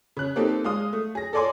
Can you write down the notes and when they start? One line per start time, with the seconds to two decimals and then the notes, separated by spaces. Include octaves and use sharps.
0.17 C#3 F#6
0.36 A#3 C4 D#4 G4 A4
0.64 G#3 F5 D#6
0.93 A3
1.15 G#4 A#6
1.33 A4 C#5 D5 G#5 C6 D6